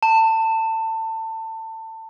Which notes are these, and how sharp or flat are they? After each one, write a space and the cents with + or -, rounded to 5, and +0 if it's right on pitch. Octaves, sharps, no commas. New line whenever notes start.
A5 +25